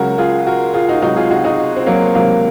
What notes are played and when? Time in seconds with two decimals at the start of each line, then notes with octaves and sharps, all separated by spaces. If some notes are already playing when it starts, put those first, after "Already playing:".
Already playing: C#2 C#3 F#3 F#4 A#4
0.18 F4 G#4
0.47 F#4 A#4
0.74 F4 G#4
0.89 D#4 F#4
1.02 C#2 C3 F#3 D#4 F#4
1.16 F4 G#4
1.30 D#4 F#4
1.44 D#4 F#4
1.76 C4
1.87 F#3 A#3
2.15 C#2 C3 D#3 F#3 A#3